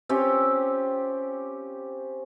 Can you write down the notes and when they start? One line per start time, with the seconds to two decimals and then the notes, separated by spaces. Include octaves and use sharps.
0.09 C4 C#4 F4 G4